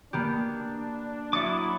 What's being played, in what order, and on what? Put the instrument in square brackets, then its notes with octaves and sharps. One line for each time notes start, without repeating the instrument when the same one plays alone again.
[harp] A#3 B3 G4 [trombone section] D4
[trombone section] F#3 [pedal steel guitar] E4 D6 [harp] D#6 A6 C#7